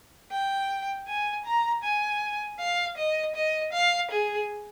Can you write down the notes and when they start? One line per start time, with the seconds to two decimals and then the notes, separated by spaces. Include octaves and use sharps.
0.32 G5
1.07 G#5
1.45 A#5
1.83 G#5
2.60 F5
2.97 D#5
3.35 D#5
3.73 F5
4.11 G#4